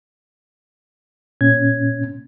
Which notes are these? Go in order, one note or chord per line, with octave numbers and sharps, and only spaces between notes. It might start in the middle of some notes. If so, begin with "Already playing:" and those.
A#2 C#4 G#6